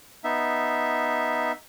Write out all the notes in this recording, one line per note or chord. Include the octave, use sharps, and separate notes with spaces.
B3 D#4 E5